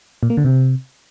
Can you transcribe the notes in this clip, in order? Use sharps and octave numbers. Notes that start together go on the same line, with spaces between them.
A#2
A#3
D3
C3